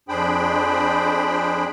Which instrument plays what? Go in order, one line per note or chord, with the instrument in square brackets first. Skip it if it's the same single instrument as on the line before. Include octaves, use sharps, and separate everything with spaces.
[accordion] F2 D4 G#4 C5 G5 B5